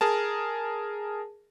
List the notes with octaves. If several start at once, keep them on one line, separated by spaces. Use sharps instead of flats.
G#4 A#4 A5